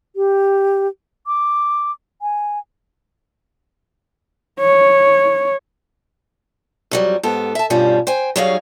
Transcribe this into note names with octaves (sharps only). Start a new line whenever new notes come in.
G4
D6
G#5
C#5
F2 F#3 G3
G#2 B3 G4 A4
E5 A5
G2 B2 F3 G3 C#4
C5 G5 G#5
F#3 G3 D#4 G#4 C#5 F5